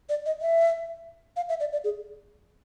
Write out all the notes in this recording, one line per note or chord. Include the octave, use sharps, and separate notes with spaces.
D5
D#5
E5
F5
E5
D5
D5
G#4